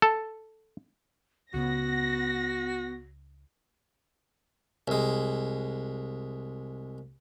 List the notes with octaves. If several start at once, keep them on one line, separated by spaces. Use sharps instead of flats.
A4
C#2 C#3 B3 F#4 A#6
C2 G#3